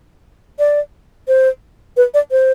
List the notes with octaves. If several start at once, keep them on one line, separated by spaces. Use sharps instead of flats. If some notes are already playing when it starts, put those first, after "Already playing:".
D5
C5
B4
D5
C5